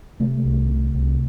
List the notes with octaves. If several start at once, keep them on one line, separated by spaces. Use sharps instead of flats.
C3 A3
C2
C3
C2